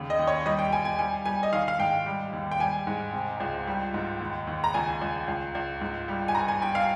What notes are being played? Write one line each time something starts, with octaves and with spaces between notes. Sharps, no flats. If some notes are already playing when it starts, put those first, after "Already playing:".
Already playing: D#2 C#3 G3
D#5
D#2
C#5
G3 D#5
G5
G3 G#5
G#5
G3 G#5
G3 G#5
D#5
D#3 F5
F5
G#2 G5
G3
D#2
G5
G3 G#5
G#2
C3
C#2
G3
G#2
D#2
D#2
A#5
C#2 G#5
C#2
C#2
C#2
G#2
G3
G#5
G2 A#5
G#5
G3 G5
F5